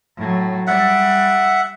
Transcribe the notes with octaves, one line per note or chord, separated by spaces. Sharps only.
A2 F#3
G3 D5 E5 F#5